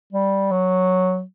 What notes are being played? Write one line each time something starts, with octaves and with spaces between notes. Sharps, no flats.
G3
F#3